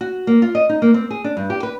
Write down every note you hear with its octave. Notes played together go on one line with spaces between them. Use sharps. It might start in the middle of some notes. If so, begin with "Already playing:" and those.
F#4
A#3
F4
D#5
D#4
A#3
C4
G#4
D4
G2
G4
B4